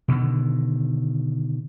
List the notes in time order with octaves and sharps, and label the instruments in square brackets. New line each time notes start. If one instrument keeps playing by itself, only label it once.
[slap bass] B2 D3 D#3